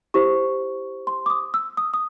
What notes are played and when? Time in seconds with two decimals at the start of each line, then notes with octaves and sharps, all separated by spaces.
0.14 E4 G4 C5 C#6
1.07 C6
1.26 D6
1.30 D#6
1.54 E6
1.77 D#6
1.94 D#6